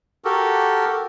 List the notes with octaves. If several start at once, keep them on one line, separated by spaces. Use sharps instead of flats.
F#4 G4 A4 A#4